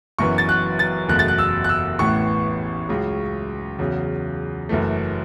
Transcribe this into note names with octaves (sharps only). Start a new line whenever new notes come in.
F#1 F#2 E3 B3 C#6
A6
F#6
A6
F#1 E2 B2 A3 F#6
A6
F#6
E6
F#6
E6
A1 A2 E3 B3 C#6
C#2 C#3 F#3
E2 C#3 F#3
F#1 F#2 E3 A3